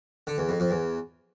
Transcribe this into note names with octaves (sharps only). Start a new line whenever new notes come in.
D3
E2
F2
F2
E2